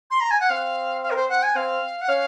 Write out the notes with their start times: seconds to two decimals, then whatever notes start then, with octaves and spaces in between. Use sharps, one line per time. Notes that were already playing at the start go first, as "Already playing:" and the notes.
0.11 C6
0.21 A#5
0.31 G#5
0.40 F#5
0.50 C4 F5
1.03 F5
1.11 A#4
1.16 C5
1.29 F#5
1.43 G#5
1.55 C4 F5
2.01 F#5
2.09 C#4 F5